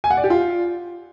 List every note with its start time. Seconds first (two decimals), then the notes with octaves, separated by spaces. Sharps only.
0.04 G#5
0.10 F#5
0.17 D5
0.24 G4
0.30 F4